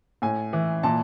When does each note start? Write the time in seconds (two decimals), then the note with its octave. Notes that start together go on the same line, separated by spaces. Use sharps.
0.22 A2 G#5
0.53 E3
0.83 A#2 A5